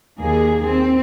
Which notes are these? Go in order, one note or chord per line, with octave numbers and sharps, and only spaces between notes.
D#2 A#3 G#4
C4